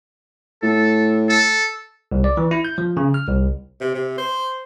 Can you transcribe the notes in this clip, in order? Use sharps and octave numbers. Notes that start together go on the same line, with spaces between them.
A2 A4
A4
C2
D5
E3
E4
G6
F3
C#3
F6
C2
C3
C3
C5